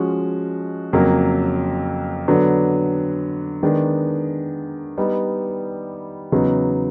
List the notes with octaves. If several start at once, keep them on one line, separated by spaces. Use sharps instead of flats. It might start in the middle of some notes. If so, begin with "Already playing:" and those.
Already playing: F3 G#3 C#4 F#4
F2 C#3 F#3 A#3
D3 F#3 B3 D4
D#3 G#3 B3 D4
G3 B3 D#4
E2 C#3 F#3 B3 D#4